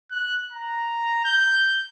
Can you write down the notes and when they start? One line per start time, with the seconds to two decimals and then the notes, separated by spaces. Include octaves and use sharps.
0.11 F#6
0.52 A#5
1.25 G6